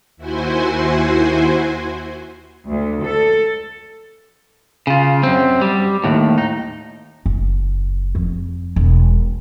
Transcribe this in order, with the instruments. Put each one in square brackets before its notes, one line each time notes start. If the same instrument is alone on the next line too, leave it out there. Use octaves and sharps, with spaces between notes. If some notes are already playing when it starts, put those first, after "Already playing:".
[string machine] D#2 E4 F#4 C5 G#5 C6
[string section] D2
A4
[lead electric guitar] C#3 F4
F#2 C4
G3
D#2 A2
D#4
[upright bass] F#1
F2
E1